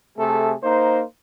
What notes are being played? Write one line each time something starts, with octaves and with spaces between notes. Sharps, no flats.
C3 A3 G#4 A4
A#3 D#4 C5